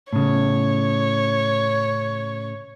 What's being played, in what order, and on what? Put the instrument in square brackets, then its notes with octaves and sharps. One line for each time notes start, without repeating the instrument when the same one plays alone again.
[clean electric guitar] A2 C#3 [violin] C#5